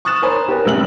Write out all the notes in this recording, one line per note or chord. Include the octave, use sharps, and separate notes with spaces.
C#6 D#6 F#6 A6 E7
A#4 C5 C#5 G#5 A#5 B5
G4 A#4 B4
A1 C3 G3 E6 F#6 F#7